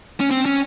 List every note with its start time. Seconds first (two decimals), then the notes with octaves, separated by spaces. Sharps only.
0.20 C#4
0.31 C4
0.46 C#4